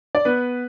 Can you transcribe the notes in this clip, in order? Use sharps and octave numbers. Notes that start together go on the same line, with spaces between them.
D5
B3 B4